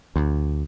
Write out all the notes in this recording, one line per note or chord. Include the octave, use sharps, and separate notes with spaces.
D2